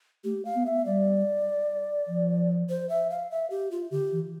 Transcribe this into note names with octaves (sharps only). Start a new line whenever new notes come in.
A3 G4
F5
B3
E5
G3 D5
F3
C5
E5
F5
E5
G4
F4
D3 G4
E3